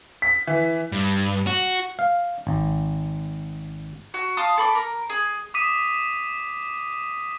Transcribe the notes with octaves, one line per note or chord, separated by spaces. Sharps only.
B6
E3
G2
F#4
F5
G#1
F#4
F5 A5 C6 D#6
A4 B5 C#6 D6
A#4
G#4
D6 D#6 B6 D#7